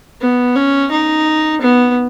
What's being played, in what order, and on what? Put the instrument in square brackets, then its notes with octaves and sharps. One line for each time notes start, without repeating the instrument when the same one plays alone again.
[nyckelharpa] B3
C#4
D#4
B3